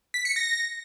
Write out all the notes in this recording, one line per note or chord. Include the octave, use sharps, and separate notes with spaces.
B6
C#7
A#6